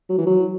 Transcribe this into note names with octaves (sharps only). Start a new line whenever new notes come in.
F#3
E3
F#3